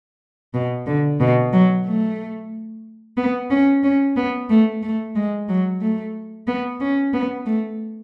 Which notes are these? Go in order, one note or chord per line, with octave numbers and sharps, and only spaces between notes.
B2
D3
B2
F#3
A3
B3
C#4
C#4
B3
A3
A3
G#3
F#3
A3
B3
C#4
B3
A3